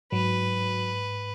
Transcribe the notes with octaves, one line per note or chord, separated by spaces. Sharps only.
G#2 F#3 B4